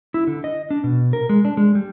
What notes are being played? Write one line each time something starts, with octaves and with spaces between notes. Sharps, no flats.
E4
D3
D#5
D4
B2
A#4
G#3
D4
G#3
G3